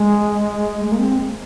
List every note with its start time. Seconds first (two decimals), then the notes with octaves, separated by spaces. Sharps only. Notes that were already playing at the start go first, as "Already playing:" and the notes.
Already playing: G#3
0.85 G#3
0.92 A#3
0.99 C4